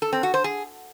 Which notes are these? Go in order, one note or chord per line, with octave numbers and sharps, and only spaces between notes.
A4
C4
F#4
C5
G#4